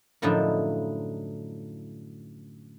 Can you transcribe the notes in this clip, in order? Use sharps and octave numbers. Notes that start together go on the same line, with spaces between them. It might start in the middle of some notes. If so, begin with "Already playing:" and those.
F#2 A2 D3 F3 D#4 E4